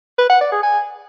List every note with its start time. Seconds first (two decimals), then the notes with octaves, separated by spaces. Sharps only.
0.18 B4
0.29 F#5
0.41 D5
0.52 G#4
0.63 G#5